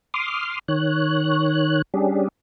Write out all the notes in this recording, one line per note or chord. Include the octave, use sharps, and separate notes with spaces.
C6 D6 D#6 F6
D#3 C#5 F#6
G3 C#4 D4 G4 G#4